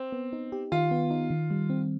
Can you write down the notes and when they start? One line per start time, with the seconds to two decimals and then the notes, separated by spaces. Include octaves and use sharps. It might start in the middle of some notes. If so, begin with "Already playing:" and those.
Already playing: C4
0.12 B3
0.33 D#4
0.52 G4
0.72 D#3 F4
0.91 B3
1.11 D#4
1.30 D#3
1.50 G3
1.70 C4